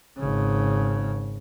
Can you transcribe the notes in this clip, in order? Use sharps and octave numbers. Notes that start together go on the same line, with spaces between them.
G#1 C#3